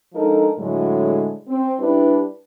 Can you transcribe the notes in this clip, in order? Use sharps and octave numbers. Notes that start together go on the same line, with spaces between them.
F3 G#3 D4 D#4 A4 A#4
A2 D3 F#3 G#3
C4
G3 D4 E4 G4 B4